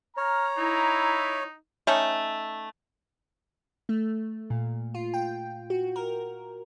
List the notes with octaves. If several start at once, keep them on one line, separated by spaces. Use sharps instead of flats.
C#5 A#5 F6
D#4 E4
A3 C#4 D#4
A3
A#2
F4
G5
F#4
A#4